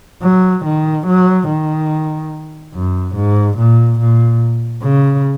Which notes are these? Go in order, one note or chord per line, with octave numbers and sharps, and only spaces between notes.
F#3
D#3
F#3
D#3
F#2
G#2
A#2
A#2
C#3